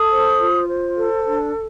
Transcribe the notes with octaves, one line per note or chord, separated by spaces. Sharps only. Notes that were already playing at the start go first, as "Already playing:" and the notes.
Already playing: A4 D#6
C5
F4
C5
A4
D4